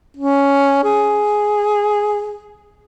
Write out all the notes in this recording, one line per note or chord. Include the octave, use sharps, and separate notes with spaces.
C#4
G#4